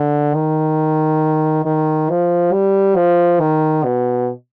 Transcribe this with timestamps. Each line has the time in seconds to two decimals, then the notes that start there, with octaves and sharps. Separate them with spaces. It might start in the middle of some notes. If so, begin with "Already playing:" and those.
Already playing: D3
0.34 D#3
1.65 D#3
2.09 F3
2.52 G3
2.96 F3
3.40 D#3
3.84 B2